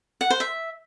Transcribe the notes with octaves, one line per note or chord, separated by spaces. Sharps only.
F#5
C5
E5